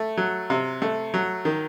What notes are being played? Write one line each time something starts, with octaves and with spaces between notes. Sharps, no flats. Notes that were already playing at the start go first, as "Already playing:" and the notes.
Already playing: A3
F#3
C3
A3
F#3
D#3